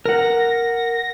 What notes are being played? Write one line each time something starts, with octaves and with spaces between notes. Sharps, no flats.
A#4 F#5 A#6